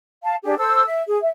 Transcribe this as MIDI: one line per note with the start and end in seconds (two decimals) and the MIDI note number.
0.23 0.36 77
0.23 0.36 81
0.44 0.57 62
0.44 0.57 67
0.44 0.57 68
0.58 0.84 69
0.58 0.84 72
0.58 0.84 88
0.86 1.03 76
1.08 1.17 68
1.21 1.29 76